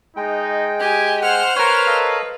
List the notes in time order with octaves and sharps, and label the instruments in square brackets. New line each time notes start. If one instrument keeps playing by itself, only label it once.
[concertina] G#3 G5 [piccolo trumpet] D#4
[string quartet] G4 [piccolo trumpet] G#5
[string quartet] C5 F6 [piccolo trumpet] F#5
[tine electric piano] A#4 C#5 [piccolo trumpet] B4
[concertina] A4 D#5 F5